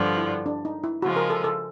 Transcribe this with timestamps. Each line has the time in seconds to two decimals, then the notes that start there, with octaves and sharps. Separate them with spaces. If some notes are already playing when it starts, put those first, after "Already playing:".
Already playing: G2 D3 F3
0.18 E4
0.46 D4
0.65 D#4
0.84 E4
1.02 C#3 F3 G#3 F#4
1.16 A#4
1.30 A4
1.44 A4